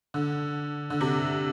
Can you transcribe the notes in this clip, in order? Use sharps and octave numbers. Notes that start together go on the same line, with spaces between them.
D3
D3
C3